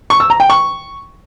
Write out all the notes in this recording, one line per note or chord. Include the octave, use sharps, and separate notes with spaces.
C#6
E6
A#5
G5
C#6